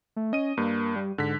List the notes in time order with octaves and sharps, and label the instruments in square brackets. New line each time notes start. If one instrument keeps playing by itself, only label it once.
[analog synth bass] A3
[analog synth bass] C#4 [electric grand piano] D#5 D#7
[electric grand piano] G2 [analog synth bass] A#3
[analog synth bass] G3
[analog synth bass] G#2 [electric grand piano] D3 B6